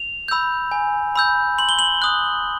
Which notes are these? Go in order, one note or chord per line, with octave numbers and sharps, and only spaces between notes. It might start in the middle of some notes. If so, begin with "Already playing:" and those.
Already playing: F7
B5 E6 G6
G#5
B5 E6 G6
C6 F#7
G7
F#7
D#6 F#6